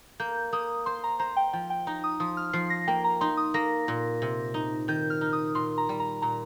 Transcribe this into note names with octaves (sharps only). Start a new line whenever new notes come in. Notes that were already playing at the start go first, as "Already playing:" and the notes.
A#3 G6
A#3 D#6
C5 C6
A#5
C5 A#5
G5
F3 G5
G5
D#4 A#5
D#6
F3 D#6
F6
F3 C7
A#6
A#3 G5
A#5
D#4 C6
D#6
A#3 A#6
A#2
C3
D#4
D#3 G6
F6
D#4
D#6
A#2 C6
A#5
G3
A#5
A#2 A#5